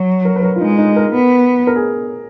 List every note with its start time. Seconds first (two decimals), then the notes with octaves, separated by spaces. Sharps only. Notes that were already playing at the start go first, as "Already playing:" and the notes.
Already playing: F#3
0.25 A#4
0.36 B4
0.43 A#4
0.56 F4
0.61 G#3 D#4
0.78 D#4
0.96 A#4
1.14 B3
1.67 A#4
1.76 G#4